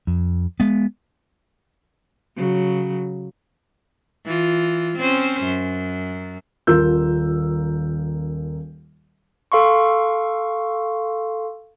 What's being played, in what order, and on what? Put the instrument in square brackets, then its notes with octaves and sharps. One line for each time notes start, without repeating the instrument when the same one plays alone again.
[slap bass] F2
G#3 B3
[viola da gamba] C#3 F#3
E3 F4
C4 C#4 C5
F#2
[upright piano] D#1 F4 A#4 E6 G6
[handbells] A4 F5 C6 C#6